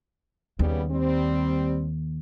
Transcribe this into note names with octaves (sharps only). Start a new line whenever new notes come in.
D#2 C#3 G3 B3
G3 C4